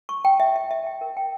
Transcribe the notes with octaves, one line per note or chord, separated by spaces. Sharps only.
C#6
G5
E5
E5
E5
G5
A#4
G5